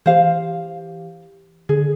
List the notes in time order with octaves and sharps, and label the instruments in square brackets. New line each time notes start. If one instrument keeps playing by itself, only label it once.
[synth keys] E3 G4 [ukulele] C5 F5
[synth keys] D3 [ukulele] G#4